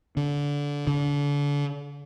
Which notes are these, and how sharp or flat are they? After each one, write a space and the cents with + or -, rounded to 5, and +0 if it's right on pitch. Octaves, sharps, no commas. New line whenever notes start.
D3 -25
D3 -35